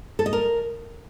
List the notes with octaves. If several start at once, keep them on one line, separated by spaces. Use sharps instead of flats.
A4
D#5
A#4